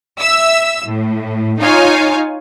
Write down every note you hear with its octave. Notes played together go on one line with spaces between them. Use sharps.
E5 E6
A2
D#4 F4 C#5 F5 G#5